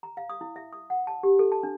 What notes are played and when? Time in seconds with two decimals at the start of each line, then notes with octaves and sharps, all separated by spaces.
0.03 A#5
0.17 F5
0.30 D#6
0.41 E4
0.56 E5
0.73 D#6
0.90 F#5
1.07 A5
1.23 G4
1.39 A4
1.52 A5
1.63 D4